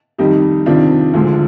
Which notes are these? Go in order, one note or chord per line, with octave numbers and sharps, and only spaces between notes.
F2 D#3 G3 D#4 G4
F2 C3 D#3 D4 F4
D2 D3 F3 G#3